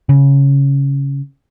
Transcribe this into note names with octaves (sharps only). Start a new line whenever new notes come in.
C#3